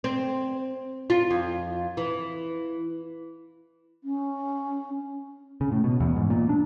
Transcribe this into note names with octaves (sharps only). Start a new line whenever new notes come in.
C4
F4
F2
E3
C#4
C#3
A2
B2
E2
G#2
A#2
D4